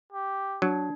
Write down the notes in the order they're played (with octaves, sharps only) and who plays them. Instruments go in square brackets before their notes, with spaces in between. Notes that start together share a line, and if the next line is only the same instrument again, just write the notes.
[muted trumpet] G4
[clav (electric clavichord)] F#3 [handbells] D4